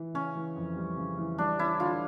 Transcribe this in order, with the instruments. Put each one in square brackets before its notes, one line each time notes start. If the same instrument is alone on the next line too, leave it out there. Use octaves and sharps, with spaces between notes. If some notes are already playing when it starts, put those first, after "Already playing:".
Already playing: [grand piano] E3
[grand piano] C#3 [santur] C#4
[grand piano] E3
F2
G3
C#3
E3
[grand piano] G3 [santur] D4
[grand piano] C#4 [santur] E4
[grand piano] D3 [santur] F4